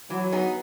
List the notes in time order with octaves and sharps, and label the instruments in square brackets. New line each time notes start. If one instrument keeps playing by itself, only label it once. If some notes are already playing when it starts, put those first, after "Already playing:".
[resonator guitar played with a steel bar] E3 [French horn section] F#3
[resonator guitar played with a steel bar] B3 D#4 G#4